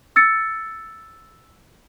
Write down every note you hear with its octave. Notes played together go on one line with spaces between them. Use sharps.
E6 A6 C#7